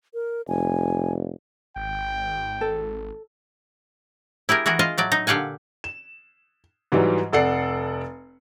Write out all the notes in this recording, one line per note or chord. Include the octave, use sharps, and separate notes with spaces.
A#4
F1 G#5
G#1 G5
A4
E4 G4 G#4 A#4
E3 F#4 G#4 A#4
F4 D#5 F5
A2 F#3 D5
D#4
A#2 D3 G4 F5 F#5 G#5
E7
G#2 E3 F#3 G3
F1 A4 D5 F#5 C7 C#7